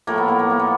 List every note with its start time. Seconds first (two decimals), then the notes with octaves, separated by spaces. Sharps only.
0.07 A2 F3 A3 A#3
0.18 B3
0.28 A#3
0.39 B3
0.50 A#3
0.59 B3